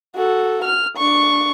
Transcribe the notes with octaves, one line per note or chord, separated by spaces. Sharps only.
F#4 A4
F6
D4 C#6